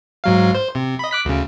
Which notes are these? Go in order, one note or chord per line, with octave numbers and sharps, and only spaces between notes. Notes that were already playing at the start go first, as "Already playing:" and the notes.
G#2 F#3 F5
C5
C3
D#5 B5
D6 F#6 B6
D2 C#3